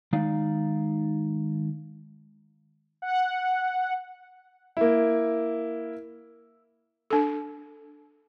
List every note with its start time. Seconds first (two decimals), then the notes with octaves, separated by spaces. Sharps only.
0.13 D#3 G#3 D#4 D5 F5
3.02 F#5
4.77 A#3 E4
7.11 D4 A4